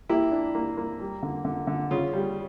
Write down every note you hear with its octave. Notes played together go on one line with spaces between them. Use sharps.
A#3 E4 G4
D4
A#3
A#3
G3
D3
D3
D3
C#3 F4
G3